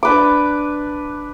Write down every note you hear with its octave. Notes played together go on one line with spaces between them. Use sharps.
D4 B4 D6